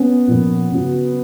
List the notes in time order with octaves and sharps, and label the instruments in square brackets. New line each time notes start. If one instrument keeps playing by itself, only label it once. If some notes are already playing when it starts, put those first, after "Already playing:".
Already playing: [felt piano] B3 C#4
A#2 F3
C#3 F#3